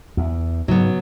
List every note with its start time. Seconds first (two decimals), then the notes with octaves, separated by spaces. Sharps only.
0.17 E2
0.68 G#2 C#3 F#3 B3